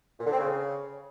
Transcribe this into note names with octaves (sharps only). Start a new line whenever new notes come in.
A#2
D3
C4
C#3